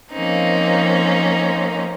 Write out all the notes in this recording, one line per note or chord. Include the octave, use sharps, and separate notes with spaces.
F3 A#3 C4 C#4 D#4